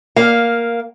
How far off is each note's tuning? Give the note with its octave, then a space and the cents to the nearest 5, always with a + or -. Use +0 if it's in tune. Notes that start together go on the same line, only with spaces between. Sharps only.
A#3 +5 F5 +0